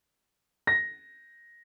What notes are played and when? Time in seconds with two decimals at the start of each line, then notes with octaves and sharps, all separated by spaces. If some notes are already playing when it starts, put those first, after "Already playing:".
0.67 A#6